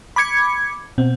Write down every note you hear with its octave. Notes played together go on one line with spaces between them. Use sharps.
B5 D6 G#6 C#7
B2 C4